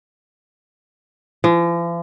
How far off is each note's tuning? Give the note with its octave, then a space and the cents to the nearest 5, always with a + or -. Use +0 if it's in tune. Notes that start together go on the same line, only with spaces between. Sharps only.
F3 -45